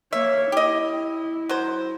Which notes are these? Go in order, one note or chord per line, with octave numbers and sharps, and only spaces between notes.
A#3 C#5 E5
E4 G4 D#5
F#3 C5